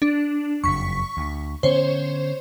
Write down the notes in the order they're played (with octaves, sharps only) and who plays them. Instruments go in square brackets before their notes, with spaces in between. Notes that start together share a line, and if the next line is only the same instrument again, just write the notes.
[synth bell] D4
[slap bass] F#1 F2 [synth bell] C#6 B6
[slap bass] D2
[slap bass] D3 B3 C#4 [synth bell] C5 C#5